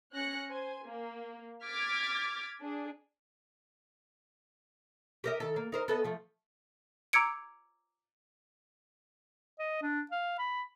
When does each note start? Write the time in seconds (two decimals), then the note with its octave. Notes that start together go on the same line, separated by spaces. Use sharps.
0.12 C#4 F#6 A#6 C#7
0.50 C5 G#5
0.86 A#3
1.67 D6 F6 G#6 A6 B6
2.60 D4 G#4
5.24 G4 A#4 D#5
5.40 D#3 A4
5.56 A#3
5.72 D#4 A#4 C5
5.88 B3 A4 D#5
6.04 F3 A3
7.13 A#5 D6 E6 G#6 C#7 D7
9.59 D#5
9.82 D4
10.11 F5
10.39 B5